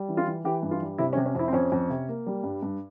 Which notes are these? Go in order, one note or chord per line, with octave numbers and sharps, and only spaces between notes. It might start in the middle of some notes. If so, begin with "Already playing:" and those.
Already playing: G3
E3
F4
E3
E3 G4
G2
F4
G3
C3 E4
C#4
C3
C#4
F2 E4
C4
F2 C#4
F2
C3
A#3
G3
G2
G2